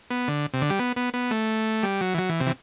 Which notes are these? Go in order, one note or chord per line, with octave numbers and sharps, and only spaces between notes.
B3
D3
C3
D3
G3
B3
B3
B3
A3
G3
F#3
E3
F#3
E3
C3
E3